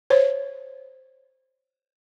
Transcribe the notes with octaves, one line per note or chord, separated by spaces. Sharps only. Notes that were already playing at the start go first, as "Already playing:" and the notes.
C5 C#5